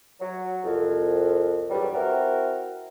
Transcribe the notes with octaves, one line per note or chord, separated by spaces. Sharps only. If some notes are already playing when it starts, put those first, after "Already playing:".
F#3
C2 F2
E2 G2 F#3 G3
C4 E4 F#4 A#4